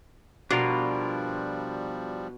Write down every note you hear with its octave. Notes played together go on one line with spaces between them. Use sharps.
B2 F3 G3 D4 F4 F#4 A#4